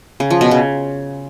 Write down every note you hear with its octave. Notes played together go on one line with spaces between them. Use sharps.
C#3
F3
B2
C#3